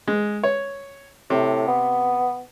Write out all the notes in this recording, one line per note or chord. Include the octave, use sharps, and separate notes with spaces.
G#3
C#5
A2 C3
B3